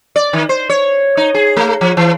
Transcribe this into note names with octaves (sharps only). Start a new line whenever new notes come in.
D5
D#3
C5
C#5
D#4
G#4
A3
F3
E3